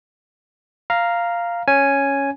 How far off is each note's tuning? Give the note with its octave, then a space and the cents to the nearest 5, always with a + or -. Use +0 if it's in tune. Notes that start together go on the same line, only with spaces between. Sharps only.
F5 -5 A#5 +0
C#4 +0 G#5 +0